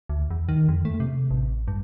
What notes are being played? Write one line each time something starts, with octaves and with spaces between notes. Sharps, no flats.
D2
E2
D#3
F2
A3
C3
A1
G2